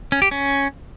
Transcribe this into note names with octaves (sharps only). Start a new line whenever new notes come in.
C#4
G4
C#4